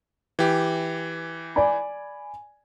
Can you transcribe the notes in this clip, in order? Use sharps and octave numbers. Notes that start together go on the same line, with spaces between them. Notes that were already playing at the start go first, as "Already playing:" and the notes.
E3 G4
D5 G#5 B5